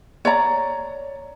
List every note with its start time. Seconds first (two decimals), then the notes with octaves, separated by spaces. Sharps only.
0.25 C#5 D5 A#5